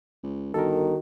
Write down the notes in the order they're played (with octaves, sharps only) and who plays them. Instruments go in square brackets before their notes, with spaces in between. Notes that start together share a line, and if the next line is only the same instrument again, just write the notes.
[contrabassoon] C#2
[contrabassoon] G1 [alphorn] D#3 [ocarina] F#4 [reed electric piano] A4 A#4